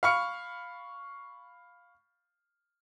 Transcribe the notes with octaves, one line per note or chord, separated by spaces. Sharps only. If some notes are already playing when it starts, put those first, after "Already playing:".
F5 B5 C#6 F6 C#7